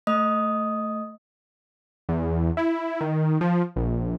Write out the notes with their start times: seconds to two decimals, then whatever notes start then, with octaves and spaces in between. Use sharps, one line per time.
0.07 A3 D#5 D#6
2.09 E2
2.57 E4
3.01 D#3
3.41 F3
3.76 A#1